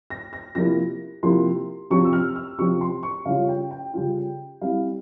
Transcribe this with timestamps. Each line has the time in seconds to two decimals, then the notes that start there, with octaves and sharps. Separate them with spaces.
0.10 A#6
0.33 A#6
0.55 C3 F3 A#3 E4 A#6
1.23 C3 F3 A#3 E4 C6
1.90 C3 F3 C4 C#6
2.05 E6
2.13 F6
2.36 E6
2.58 C3 F3 C4 C#6
2.81 C6
3.03 C#6
3.25 C#3 G3 C#4 F4 F5
3.49 G5
3.71 G5
3.93 C#3 G3 C#4 F4
4.61 G3 C4 E4 F5